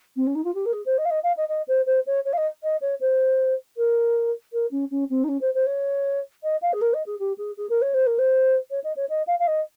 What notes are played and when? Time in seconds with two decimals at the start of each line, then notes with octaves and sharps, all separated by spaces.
0.16 C4
0.26 C#4
0.35 D#4
0.44 F4
0.54 G4
0.65 A#4
0.72 G#4
0.86 C5
0.98 D#5
1.05 F5
1.10 D#5
1.23 F5
1.36 D#5
1.48 D#5
1.68 C5
1.86 C5
2.06 C#5
2.25 C#5
2.33 F5
2.37 D#5
2.63 D#5
2.81 C#5
3.00 C5
3.77 A#4
4.52 A#4
4.71 C#4
4.91 C#4
5.10 C4
5.23 D#4
5.28 C#4
5.41 C5
5.54 C5
5.66 C#5
6.43 D#5
6.62 F5
6.73 G#4
6.81 A#4
6.93 D#5
7.06 G#4
7.19 G4
7.38 G#4
7.57 G#4
7.69 A#4
7.81 C#5
7.94 C5
8.06 A#4
8.18 C5
8.70 C#5
8.83 D#5
8.96 C#5
9.09 D#5
9.27 F5
9.39 F5
9.47 D#5